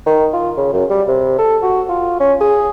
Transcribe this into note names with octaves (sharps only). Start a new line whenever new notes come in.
D#3
F4
C#3
F#2
G3
C3
A4
F#4
F4
C#4
G#4